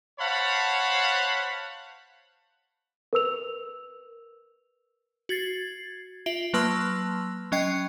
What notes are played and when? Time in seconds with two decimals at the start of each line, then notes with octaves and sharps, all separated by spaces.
0.20 C5 C#5 F5 F#5 A5 B5
3.13 A#4 B4 E6 F7
5.29 F#4 G#6 A6 C7
6.26 F4 E5 D7 F#7 G7
6.53 F#3 A#3 B4 A5 C6 E6
7.52 F#3 C#4 D#5 G5 C7